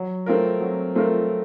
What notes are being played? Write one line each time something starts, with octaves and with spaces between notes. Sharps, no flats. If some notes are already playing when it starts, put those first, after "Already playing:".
Already playing: F#3
A3 C4 F4 A#4
F#3
A3 C4 F4 A#4